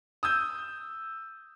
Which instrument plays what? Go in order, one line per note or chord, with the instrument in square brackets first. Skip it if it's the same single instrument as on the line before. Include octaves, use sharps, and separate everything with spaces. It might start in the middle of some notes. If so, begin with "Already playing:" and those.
[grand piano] D#6 E6 G6